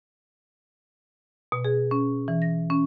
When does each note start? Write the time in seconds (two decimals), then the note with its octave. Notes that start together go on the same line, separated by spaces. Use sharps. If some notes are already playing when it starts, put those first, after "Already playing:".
1.52 B2
1.65 G#4
1.91 C#4
2.28 E3
2.42 A#6
2.70 C#4